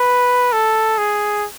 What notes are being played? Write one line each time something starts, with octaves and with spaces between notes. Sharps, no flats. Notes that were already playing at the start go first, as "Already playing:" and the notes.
Already playing: B4
A4
G#4